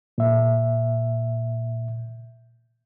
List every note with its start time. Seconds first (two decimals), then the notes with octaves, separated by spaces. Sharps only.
0.18 A#2 E5